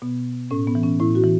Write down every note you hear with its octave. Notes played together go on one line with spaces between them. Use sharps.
B2 B3
A2 C#4
B3
E3
C#4
A2 E4
F#4
E3